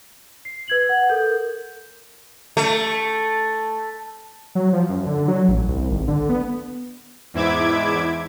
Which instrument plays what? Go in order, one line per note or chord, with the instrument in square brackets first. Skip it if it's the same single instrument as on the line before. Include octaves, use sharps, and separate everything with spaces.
[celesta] C7
B4 G#6 F#7
F#5
A4 A#4 G6
[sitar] A3
[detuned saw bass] F#3
F3
F#2
D3
F#3
A1
C2
G#1
D3
B3
[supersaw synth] E2 G#2 E4 E5 D6 G#6